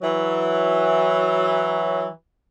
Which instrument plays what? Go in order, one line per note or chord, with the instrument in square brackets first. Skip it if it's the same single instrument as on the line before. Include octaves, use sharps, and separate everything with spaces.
[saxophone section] E3 F#3